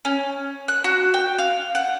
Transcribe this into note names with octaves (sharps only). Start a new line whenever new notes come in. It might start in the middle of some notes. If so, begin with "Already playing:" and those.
C#4
F#6
F#4
G5
F5
F#5